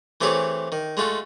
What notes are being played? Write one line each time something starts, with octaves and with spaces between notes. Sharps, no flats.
E3 A3 C4 G4 G#4 C#5
D#3
G#3 A3 F4 F#4